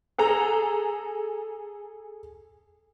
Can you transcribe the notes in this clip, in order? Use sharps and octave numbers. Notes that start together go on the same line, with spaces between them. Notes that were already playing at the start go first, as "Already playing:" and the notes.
G#4 A4 A#5